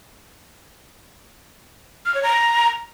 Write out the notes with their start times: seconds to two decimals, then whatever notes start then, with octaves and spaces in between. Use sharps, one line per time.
2.06 F6
2.14 C#5
2.23 A#5